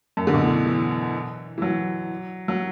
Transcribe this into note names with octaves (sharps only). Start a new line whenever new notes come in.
F#2
D3
B2
A2
E3
E3
F#3
F#3